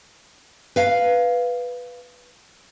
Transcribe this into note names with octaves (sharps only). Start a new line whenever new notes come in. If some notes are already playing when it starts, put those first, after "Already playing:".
B4 F5